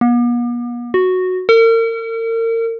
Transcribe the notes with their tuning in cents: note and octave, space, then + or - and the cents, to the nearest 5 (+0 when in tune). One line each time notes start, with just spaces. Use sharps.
B3 -45
F#4 -5
A#4 -40